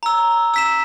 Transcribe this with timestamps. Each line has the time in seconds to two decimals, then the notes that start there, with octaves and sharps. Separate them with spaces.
0.03 A#5 E6
0.54 E6 B6 E7